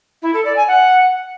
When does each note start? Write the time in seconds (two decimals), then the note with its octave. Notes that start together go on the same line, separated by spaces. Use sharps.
0.22 E4
0.33 A4
0.45 D5
0.56 G#5
0.67 F#5